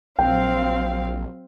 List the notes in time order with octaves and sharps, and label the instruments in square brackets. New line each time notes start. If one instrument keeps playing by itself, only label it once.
[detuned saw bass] A#1 [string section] F#3 C4 F5 [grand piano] G5